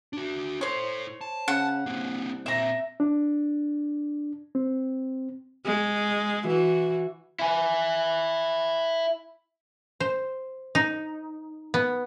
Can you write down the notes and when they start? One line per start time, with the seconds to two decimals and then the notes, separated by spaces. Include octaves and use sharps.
0.13 D4 F#4
0.61 E4 A4 C5 C#5
1.21 A5
1.48 C#3 F#5
1.86 C2 A#3 C4
2.46 A#2 C4 E5 A#5
3.00 D4
4.55 C4
5.65 G#3
6.45 E3 F#4
7.39 E4 G#5
10.00 C5
10.75 D#4
11.74 B3